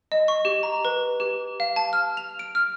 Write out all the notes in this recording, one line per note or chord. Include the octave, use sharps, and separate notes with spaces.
D#5
C#6
G4
A#5
B4
G4
F5
A5
F6
F7
D7
F6